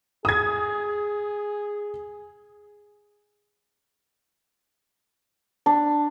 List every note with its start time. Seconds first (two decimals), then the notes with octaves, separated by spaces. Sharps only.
0.25 G#4 D#6 G#6
5.66 D4